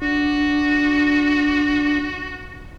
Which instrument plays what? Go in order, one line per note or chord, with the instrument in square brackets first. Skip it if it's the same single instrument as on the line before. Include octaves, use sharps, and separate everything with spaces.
[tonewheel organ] D4 [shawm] F#4